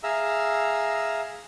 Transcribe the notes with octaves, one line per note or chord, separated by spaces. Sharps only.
G#4 E5 F5 A#5 E6